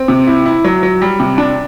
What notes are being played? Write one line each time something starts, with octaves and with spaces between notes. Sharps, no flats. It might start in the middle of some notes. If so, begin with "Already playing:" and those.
Already playing: C4
C3
E4
E4
F#3
F#3
G3
C3
D4